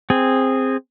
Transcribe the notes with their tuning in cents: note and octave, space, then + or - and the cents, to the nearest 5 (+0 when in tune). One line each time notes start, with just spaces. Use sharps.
C4 +0 G#4 -10